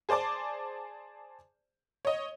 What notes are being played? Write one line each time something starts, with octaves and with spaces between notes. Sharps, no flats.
G#4 C5 D5 A5 D6
C#5 D#5